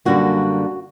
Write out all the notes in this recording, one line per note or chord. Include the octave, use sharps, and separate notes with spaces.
F#2 D3 G3 A#3 F#4